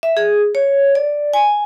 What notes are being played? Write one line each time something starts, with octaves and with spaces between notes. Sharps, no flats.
E5
G#4
C#5
D5
G#5